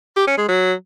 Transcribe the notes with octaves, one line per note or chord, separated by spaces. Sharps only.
G4
C#4
G#3
F#3